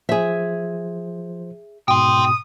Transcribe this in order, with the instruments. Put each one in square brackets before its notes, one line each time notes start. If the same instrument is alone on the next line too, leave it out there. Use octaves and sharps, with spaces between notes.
[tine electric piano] F3 C5 [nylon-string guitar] G#4 E5
[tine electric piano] G#2 B2 [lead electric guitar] G5 C6 [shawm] D#6